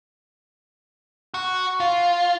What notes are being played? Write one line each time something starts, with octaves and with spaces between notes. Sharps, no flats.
F#4
F4